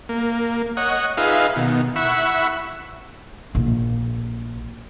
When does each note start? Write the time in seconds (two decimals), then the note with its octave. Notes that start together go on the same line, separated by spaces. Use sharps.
0.09 A#3
0.77 C#5 D#5 F#5
1.17 D#4 F4 G#4 B4 E5 F5
1.56 B2 D#3
1.96 E4 F#5 B5 C#6 E6
3.55 A#1 E4